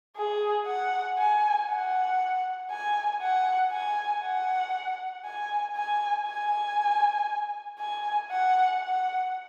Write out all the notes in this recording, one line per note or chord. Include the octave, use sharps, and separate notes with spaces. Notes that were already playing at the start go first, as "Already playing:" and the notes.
G#4
F#5
G#5
F#5
G#5
F#5
G#5
F#5
G#5
G#5
G#5
G#5
F#5
F#5